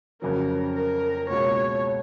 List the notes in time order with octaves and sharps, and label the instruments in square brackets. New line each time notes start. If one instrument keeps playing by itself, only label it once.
[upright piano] F2 C#3 F#3 C#4 [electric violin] A#4
[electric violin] A#4
[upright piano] C#2 B2 A#3 F4 G#4 [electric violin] C#5